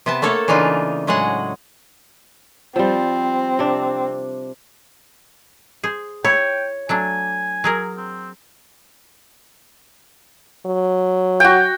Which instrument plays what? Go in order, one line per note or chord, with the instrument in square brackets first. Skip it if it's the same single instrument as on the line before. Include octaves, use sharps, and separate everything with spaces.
[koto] C3 B3 A5
A3 A#3 A4 C#5 A5
C#3 E3 D4 D#4 F4
A2 F#3 G#3 G#4 F#5
[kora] F3 G3 [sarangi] C4
[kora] C3 D4
[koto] G#4 C5
[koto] E4 [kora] C#5 [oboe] G5
[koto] F#3 A3 D4 [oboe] G#5
[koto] F#3 G#4 A#4
[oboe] C4
[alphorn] F#3
[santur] F#4 G5